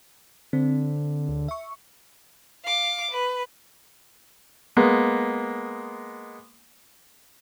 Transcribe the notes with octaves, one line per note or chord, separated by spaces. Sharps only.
D3 C4
D2
E5 C#6
F5 D6
B4
G#3 A#3 B3